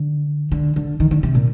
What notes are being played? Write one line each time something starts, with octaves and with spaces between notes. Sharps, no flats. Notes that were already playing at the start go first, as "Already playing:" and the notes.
Already playing: D3
D3
D3
D#3
D3
C3
A#2